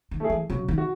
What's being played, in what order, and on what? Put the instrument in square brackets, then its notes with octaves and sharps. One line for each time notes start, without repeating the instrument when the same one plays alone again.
[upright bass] D#3
[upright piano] A3 E4 G#4
[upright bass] E3
[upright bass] C#3 [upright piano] F#3
[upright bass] D#3
[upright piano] F#4